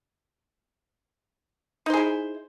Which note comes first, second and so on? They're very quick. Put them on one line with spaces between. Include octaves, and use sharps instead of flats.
D#4 C5 G#4 E4